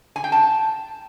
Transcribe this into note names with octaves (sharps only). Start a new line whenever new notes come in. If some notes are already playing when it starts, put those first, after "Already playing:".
G#5
G5
A5